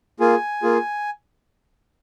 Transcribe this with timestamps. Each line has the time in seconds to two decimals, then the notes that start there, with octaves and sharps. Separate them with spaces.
0.20 A#3 F4 G#4 G#5
0.63 A#3 F4 G#4